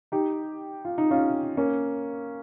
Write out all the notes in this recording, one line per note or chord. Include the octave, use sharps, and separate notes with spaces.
D#4 G4
F4
D#4
C#4 F4
A#3 C#4